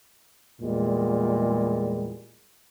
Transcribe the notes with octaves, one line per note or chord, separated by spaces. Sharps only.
E2 A#2 G3 G#3